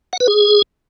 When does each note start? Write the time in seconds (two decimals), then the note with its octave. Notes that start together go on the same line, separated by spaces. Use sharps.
0.13 F#5
0.20 B4
0.28 G#4